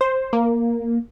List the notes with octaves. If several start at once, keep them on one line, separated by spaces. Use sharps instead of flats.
C5
A#3